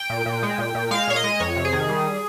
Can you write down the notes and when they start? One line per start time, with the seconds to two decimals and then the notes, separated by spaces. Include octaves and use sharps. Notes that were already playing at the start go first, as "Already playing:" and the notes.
Already playing: G5
0.10 A#2
0.26 A#2
0.43 G#3
0.58 A#2
0.75 A#2
0.91 G#3 F5
1.08 A#2 C#5
1.16 D#5
1.24 G#3
1.40 F2 C#5
1.56 C3
1.65 G#4
1.73 D#3
1.89 G3